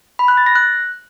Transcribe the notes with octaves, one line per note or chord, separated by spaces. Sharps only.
B5
F#6
A6
A#6
F#6